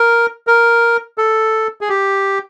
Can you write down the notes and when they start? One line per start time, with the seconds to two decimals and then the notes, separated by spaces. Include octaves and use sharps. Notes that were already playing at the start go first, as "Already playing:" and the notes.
Already playing: A#4
0.47 A#4
1.18 A4
1.81 G#4
1.89 G4